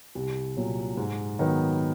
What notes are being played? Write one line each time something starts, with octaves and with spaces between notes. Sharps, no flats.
C2
A#2 F#3
G#2
D#3 F#3 B3